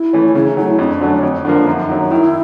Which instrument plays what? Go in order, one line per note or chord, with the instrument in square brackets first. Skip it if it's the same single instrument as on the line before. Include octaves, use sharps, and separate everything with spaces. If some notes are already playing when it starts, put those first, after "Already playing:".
Already playing: [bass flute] E4
[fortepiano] E3 A3 C#4
[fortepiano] C#3 [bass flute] E4
[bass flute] D#4
[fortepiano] F#3 A3 [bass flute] D#4
[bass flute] E4
[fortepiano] F2 [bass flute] D4
[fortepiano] D3 F#3 A3 C#4
F2
[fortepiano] D3 F3 A#3 [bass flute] D4
[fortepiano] F#2 [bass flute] D#4
[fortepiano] D#3 F#3
[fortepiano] D#3 [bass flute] E4